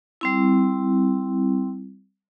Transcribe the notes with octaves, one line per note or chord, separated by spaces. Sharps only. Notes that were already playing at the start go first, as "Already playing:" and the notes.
G3 C4 E4